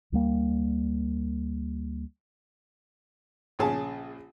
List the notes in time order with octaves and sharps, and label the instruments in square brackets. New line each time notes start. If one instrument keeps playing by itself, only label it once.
[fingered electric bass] D2 G3 A#3
[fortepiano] A#1 C#3 C#4 G#4 A5